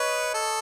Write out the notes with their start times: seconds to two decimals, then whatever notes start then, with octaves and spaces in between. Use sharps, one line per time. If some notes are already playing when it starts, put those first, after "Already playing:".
Already playing: B4 C#5 D#5
0.34 A4